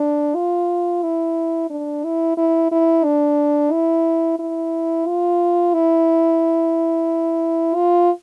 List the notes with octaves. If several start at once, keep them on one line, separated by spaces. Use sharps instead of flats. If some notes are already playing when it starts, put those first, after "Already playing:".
Already playing: D4
F4
E4
D4
E4
E4
E4
D4
E4
E4
F4
E4
F4